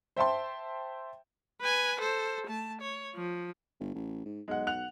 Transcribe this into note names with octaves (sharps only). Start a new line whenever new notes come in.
C5 E5 G5 A5 C6
B4 G#5
A4 C5
A3 A5
C#5
F3
G1
A1
G#2
B1 G#3 F#5
F#5 F#6 F7